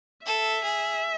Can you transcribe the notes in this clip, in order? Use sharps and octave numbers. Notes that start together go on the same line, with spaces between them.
A4 E5
G#4